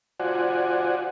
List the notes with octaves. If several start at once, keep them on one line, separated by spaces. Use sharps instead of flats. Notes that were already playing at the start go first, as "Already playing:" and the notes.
F4 F#4 C5 D5 F#5 G#5